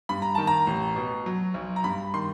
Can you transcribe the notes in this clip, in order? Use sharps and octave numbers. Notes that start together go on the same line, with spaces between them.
G2 B5
A#5
D#3 A5
A#5
A1
B2
F#3
B1
A#5
G2 B5
D#3 C6